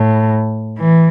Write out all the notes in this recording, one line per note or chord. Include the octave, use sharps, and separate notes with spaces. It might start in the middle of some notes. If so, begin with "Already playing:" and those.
Already playing: A2
E3